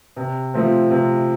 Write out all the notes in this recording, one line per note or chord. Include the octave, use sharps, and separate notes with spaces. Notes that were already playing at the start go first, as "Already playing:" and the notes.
C3
F3 A3 C4
C3